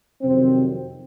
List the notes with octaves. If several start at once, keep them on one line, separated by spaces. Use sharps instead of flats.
F2 C3 D#3 F#3 C4